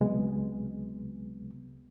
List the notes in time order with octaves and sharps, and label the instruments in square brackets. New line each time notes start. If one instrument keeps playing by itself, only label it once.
[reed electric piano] C#2 C3 F#3 G#3 B3